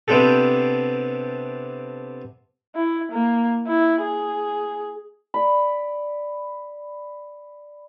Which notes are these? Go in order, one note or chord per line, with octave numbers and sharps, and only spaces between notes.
C3 B3 C4 D4 G4 A4
E4
A#3
E4
G#4
D5 B5